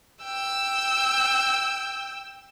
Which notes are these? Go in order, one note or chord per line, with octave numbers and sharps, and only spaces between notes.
G5 E6